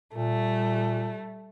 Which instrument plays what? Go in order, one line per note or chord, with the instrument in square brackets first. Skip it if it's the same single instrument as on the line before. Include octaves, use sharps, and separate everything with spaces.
[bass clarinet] A#2 [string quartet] G3 A3